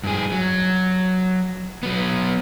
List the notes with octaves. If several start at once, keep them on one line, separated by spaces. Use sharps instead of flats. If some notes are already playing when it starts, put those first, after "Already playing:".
G2 G#4
F#3
F#3 B3